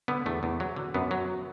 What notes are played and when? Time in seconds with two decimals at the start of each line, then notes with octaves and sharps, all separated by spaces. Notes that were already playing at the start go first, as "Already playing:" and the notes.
0.08 D3 B3
0.26 E2 A3
0.43 E2
0.60 F#3
0.76 D3
0.94 F#2 B3
1.11 F#3